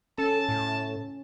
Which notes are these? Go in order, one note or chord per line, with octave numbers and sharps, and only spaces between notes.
C#4 A4 A5
A2